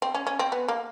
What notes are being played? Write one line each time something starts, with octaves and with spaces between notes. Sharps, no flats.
C4
C#4
C#4
C4
B3
A#3